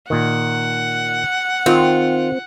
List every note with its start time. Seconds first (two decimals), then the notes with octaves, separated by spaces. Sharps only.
0.10 A#2 D#3 F#5
1.66 D#3 C4 F4